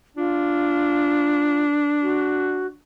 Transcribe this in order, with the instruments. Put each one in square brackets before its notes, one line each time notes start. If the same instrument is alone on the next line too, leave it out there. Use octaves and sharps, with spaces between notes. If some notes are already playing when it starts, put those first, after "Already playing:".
[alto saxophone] D4 [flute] F4
[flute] F#4